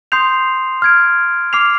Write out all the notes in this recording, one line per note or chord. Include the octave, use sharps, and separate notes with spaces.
C6 D#6 G6 C7 F7
F6 G#6 D7
D6 F6 C7 F7